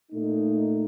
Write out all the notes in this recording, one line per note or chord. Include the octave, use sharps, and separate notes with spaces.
A#2 A3 D#4